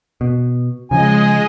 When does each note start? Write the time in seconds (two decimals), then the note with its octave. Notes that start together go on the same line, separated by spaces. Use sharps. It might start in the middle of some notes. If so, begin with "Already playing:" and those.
0.21 B2
0.91 C#3 F3 G#3 D#5 G#5